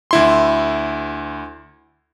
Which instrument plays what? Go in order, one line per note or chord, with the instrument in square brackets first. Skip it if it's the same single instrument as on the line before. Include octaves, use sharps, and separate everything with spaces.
[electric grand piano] D2 E4 C6